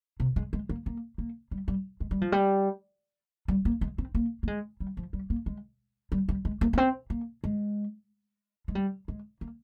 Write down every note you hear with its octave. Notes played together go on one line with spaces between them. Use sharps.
C3
G#3
G#3
A#3
A#3
A#3
G3
G3
G#3
G3
F3
G3
G3
A#3
G#3
C4
A#3
A#3
G#3
G3
F3
G3
A#3
G#3
G3
G3
G#3
A#3
A#3
C4
A#3
G#3
G#3
G3
G#3
A#3